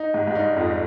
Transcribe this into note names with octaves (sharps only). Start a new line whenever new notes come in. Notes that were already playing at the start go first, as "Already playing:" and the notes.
Already playing: D#4
G#2
G#2
G2 D#4
F2